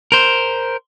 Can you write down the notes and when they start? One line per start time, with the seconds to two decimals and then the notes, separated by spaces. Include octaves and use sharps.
0.12 A#4 C5